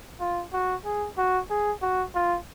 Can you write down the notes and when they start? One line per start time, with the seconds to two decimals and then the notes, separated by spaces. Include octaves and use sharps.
0.20 F4
0.53 F#4
0.85 G#4
1.18 F#4
1.50 G#4
1.82 F#4
2.15 F4